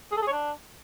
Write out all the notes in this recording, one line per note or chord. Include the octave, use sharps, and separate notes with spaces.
G#4
A4
G#4
C#5
D4